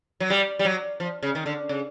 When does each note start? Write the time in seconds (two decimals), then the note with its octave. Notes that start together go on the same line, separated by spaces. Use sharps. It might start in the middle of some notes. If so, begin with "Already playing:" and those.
0.20 F#3
0.30 G3
0.59 G3
0.65 F#3
1.00 F3
1.23 C#3
1.35 D#3
1.46 D3
1.69 C#3